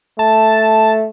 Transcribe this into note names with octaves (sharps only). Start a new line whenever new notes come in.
A3 A5